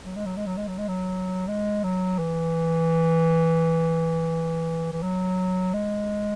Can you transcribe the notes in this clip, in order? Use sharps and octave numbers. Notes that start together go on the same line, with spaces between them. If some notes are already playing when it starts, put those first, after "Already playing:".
F#3
G#3
F#3
G#3
F#3
G#3
F#3
G#3
F#3
G#3
F#3
E3
E3
F#3
G#3